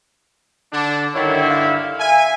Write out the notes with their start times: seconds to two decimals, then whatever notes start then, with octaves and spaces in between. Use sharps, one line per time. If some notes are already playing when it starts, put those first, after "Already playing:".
0.73 D3 D4
1.15 G2 D3 D#3 E4 C#5
1.50 F5
2.00 E5 G#5